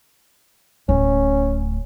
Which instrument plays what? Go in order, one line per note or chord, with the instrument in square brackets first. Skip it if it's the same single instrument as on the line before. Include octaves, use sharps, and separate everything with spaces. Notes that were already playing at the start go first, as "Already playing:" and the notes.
[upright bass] D1 A3 [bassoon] C#4